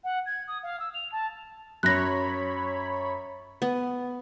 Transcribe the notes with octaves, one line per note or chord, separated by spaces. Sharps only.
F#5
G#6
D#6
F5
E6
F7
A5
F#2 C#5 B5 F#6 A#6
B3